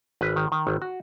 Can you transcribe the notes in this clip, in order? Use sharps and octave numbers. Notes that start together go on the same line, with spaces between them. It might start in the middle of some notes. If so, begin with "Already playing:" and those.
G#1 B4
D#3
D#3
G#1
F#4